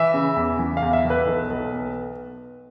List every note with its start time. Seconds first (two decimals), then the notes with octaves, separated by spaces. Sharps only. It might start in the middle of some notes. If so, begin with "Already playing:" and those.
Already playing: E3 E5
0.14 C#3
0.36 E2
0.59 E3
0.77 F5
0.82 E2
0.93 E5
1.05 E3
1.10 B4
1.27 B1
1.50 B1
1.73 B3